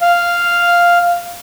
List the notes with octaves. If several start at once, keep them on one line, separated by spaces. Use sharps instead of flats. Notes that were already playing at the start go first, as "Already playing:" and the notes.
F5